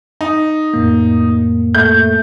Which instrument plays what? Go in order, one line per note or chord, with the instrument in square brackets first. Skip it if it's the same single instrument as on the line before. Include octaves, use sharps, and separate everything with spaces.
[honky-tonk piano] D#4
[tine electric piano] F2 A2 A#3
[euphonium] A3 [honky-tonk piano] G6